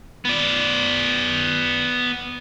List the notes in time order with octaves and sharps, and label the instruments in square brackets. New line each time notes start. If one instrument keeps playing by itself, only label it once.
[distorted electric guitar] B3 D5